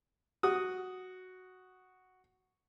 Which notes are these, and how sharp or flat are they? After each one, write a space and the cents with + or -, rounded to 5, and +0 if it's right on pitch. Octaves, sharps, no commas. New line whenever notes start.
F#4 +0 D#6 +0